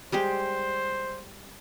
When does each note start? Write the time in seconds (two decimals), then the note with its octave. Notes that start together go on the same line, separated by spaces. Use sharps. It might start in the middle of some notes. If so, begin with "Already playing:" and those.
0.12 G3 G#3 G4 C5